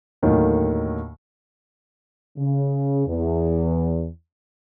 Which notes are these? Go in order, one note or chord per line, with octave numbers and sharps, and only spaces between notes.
D#2 A2 D3 D#3 F#3
C#3
E2